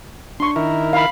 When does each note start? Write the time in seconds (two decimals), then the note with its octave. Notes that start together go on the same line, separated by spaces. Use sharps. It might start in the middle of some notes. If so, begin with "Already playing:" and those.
0.40 D4 C6 C#6
0.56 D#3 E4 A#4
0.93 F5 B5